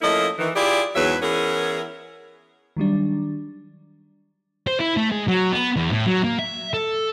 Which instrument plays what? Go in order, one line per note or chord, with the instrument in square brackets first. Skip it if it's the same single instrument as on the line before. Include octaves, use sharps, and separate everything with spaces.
[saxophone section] F3 A3 A#3 C#4 E4 D#5
D#3 E3
E4 F4 G4 G#4 D5
E2 G#2 F#3 B4 E5
E3 B3 C#4 E4 G#4 A#4
[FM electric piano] D#3 F#3 G3 D4
[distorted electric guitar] C5
E4
A3
G#3
F#3
B3
E2
A2
F#3
A#3
E5
A4